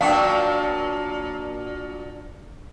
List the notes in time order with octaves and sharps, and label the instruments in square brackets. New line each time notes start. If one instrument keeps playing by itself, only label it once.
[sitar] A#2 F#3 D4 [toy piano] F5 G5